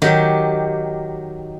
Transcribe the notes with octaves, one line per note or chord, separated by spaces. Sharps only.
D#3 F#3 G4